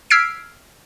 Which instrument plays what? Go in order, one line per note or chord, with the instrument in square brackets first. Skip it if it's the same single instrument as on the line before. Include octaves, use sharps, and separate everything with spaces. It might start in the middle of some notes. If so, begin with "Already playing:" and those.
[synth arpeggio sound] E6 F6 G#6 B6 C7 D7